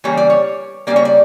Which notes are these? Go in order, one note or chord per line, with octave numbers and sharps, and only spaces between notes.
C#3 E3 G3 A#3 C#5
D5
C#5
C#3 G3 A#3 D5
C#5
D5